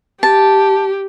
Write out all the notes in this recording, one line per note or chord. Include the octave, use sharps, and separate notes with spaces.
G4 A5